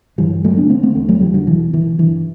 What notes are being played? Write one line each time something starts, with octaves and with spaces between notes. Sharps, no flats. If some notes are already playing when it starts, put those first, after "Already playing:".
G2 E3 G3
D3 F#3 A3
B3 D4
D3 A3 C4
A3 C4
E2 A3 C4
F#3 A3
E2 E3 G3
D3 F#3
B2 E3
B2 E3
G2 E3